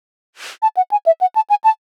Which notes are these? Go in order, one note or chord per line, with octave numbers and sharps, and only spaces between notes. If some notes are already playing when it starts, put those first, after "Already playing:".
A5
F#5
G#5
E5
F#5
A5
G#5
A5